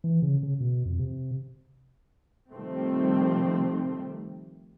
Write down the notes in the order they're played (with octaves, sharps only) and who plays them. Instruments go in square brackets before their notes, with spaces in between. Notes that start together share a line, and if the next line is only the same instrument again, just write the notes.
[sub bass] E3
C#3
C#3
B2
F2
C3
[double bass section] C3 D#3 F3 G3 A3 C4